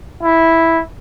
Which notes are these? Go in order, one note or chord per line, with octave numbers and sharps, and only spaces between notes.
E4